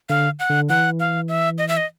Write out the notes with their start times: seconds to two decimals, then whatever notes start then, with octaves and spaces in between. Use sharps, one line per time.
0.09 D3 F5
0.39 F#5
0.50 D3
0.69 E3 F#5
1.00 F5
1.29 E5
1.58 D#5
1.68 E5
1.77 D#5